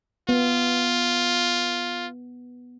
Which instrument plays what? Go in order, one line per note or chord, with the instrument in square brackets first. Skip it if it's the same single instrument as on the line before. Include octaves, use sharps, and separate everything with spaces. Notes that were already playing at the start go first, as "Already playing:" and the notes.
[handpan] B3 [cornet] F4